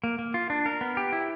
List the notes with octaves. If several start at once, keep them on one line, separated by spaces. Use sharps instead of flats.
A#3
A#3
F4
D4
A#4
B3
G4
E4